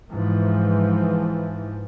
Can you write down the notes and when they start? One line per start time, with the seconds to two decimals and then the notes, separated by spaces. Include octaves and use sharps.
0.12 G#2 E3 F3